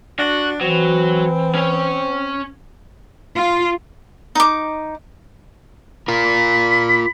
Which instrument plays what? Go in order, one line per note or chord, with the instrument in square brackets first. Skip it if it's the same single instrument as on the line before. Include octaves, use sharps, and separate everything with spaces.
[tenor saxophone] D4 [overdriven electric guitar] F#4
[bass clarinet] E3 [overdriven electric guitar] F#3 [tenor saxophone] C4
[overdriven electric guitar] C#4 C#5
[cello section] F4
[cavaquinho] D#4 D6
[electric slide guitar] F4 A#4 [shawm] B5